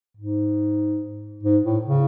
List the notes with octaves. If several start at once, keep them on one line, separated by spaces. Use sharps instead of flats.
G#2
G#2
A2
C#3